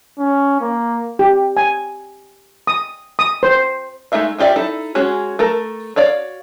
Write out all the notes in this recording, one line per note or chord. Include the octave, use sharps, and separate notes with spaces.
C#4
A#3
G4
G#5
D#6
D#6
C5
G#3 A3 D#4 E5 F5
C#4 F4 G4 D5 E5
D#4 E4 A4
G#3 C#4 F#4 G#4
A3 A4 A#4
F#4 C#5 D5 F5